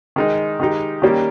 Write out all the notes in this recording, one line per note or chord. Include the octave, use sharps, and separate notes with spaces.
D#3 G#3 D#4
D#3 G#3 D#4 G4
D#3 G3 A#3 C#4 G4